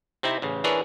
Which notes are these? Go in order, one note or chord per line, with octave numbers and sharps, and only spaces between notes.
C3 C4 D#4 E4
A1 C#3
E3 D4 G#4 A#4 B4 C#5